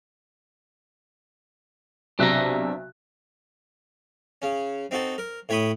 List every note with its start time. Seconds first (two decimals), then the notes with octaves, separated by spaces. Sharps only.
2.19 B1 C3 D4 E5 A#5 F#6
4.42 C#3 C#4
4.91 C4 D#4 F#4 A4
5.18 A#4
5.49 A2 C#5 G5 B5 C#6 D#6